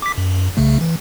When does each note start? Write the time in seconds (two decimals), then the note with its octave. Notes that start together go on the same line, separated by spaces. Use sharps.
0.02 D6 B6
0.18 F#2
0.57 C2 C#3 A3
0.81 E3